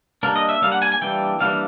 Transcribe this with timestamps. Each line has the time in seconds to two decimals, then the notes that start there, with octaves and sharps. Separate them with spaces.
0.23 G3 A#3 D4 A#4
0.36 D#5
0.49 E5
0.62 G3 A#3 D4 F5
0.72 F#5
0.82 G#5
0.92 G#5
1.01 E3 G3 A#3 D4 G5
1.40 E3 G3 A#3 D4 F5